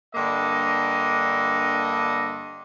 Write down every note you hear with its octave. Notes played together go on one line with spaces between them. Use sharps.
G2 D3 A#3 D#5